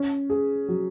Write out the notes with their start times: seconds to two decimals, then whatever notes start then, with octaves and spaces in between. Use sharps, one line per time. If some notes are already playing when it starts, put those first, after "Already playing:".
Already playing: C#4
0.30 G#4
0.68 F#3